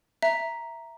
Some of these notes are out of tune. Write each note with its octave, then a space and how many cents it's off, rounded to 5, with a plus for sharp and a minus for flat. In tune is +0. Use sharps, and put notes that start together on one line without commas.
E5 +0 A#5 +0